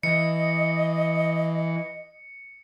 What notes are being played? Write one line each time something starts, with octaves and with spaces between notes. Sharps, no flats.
E3 D#5 C#7